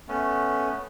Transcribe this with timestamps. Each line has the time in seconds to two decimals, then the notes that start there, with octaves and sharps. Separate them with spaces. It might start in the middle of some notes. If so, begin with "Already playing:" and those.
0.08 A3 B3 C#4